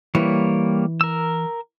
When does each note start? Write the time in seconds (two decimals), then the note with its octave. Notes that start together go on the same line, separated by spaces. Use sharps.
0.15 E3 G3 A#3 C#5
1.01 A#4 E6